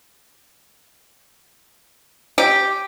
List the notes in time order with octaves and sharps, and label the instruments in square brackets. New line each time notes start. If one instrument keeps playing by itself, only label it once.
[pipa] G4